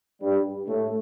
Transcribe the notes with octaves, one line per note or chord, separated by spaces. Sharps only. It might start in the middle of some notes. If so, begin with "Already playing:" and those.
G2 G3
A2 A3